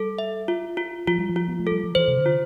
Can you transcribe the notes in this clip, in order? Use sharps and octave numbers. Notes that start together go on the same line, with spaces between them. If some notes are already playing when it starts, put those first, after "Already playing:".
Already playing: G3 A4
E5
F4
F4
F3 F4
G3
F3
F4
B3
A3
G3 A4
F3
E3 C5
C3
D3
F4